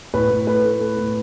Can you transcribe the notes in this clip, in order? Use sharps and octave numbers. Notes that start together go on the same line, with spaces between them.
A2 B4
A2
A3 B4
A3
A3
A2